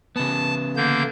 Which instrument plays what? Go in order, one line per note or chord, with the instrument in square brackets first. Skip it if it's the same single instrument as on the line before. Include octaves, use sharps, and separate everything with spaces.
[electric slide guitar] C#3 B3 [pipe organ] A5
[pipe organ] D3 A#3 G6